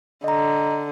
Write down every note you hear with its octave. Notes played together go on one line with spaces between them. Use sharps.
D3 D#5 A#5